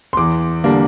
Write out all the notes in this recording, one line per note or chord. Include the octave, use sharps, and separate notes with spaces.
C6
E2 D6
D3 G3 A#3 D4